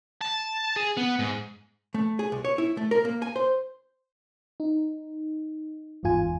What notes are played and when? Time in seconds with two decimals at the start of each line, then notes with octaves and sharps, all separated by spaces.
0.21 A5
0.76 G#4
0.97 B3
1.19 G#2
1.94 A3
2.19 G#4
2.32 C2
2.45 C#5
2.58 E4
2.77 A3
2.91 A#4
3.05 A#3
3.22 G#5
3.36 C5
4.60 D#4
6.03 G1 E2 G#2 F4 G#5